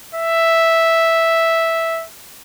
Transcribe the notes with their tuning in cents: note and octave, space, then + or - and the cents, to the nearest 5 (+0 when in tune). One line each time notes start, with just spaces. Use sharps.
E5 -5